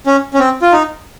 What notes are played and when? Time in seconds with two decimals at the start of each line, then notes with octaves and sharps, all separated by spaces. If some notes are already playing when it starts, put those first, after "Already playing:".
0.06 C#4
0.34 C#4
0.39 C4
0.62 F4
0.73 D#4